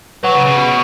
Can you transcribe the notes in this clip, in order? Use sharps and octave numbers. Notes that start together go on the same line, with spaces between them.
F#3 B4 F#5 C#6
C#3
C#3
B2
C#6